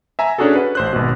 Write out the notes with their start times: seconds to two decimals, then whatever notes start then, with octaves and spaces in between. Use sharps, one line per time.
0.19 E5 G#5 A#5
0.38 C#4 D4 F#4 G#4 A4
0.55 B4 F#5
0.75 A1 C5 F#6
0.93 G#1 B2